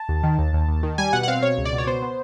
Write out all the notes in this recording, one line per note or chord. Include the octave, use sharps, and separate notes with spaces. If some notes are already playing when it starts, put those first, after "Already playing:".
Already playing: A5
D#2
D#3
D#2
D#2
D#2
D#3
G3 G#5
B2 F#5
F#5
C4 F5
B2 C#5
C#2
D5
B2
C#5
B3 C5
B3